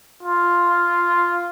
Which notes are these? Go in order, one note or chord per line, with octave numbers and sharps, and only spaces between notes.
F4